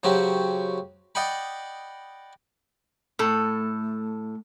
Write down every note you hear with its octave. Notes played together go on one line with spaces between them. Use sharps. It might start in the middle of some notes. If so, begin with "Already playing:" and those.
C#3 F#3 C4 F#4 G4
D5 D#5 F#5 G5 B5
A2 A3 A4